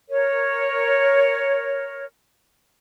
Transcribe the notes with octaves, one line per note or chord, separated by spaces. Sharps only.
A#4 C#5